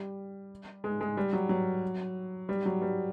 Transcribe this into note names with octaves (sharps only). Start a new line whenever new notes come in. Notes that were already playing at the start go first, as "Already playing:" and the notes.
Already playing: G3
G#3
G#3
G3
F#3
F#3
G3
F#3
G3